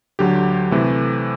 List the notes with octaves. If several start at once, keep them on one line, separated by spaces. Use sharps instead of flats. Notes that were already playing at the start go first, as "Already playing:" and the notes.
D2 D3 F#3 G4
C3 E3 A3